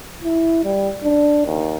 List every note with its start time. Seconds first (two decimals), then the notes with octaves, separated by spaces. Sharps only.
0.24 E4
0.64 G3
1.04 D4
1.46 D#2